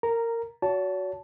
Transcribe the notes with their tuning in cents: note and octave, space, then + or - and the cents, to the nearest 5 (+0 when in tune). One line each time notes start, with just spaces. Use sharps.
A#4 -20 A#5 +0
F#4 +0 C#5 +40 A5 -5